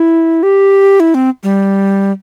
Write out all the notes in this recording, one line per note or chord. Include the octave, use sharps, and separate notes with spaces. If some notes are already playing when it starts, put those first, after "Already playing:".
Already playing: E4
G4
E4
C4
G3